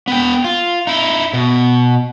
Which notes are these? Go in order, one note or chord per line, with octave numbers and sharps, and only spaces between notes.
B3 G5
F4
D#4 E4
B2